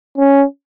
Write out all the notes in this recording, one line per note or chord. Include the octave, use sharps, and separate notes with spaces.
C#4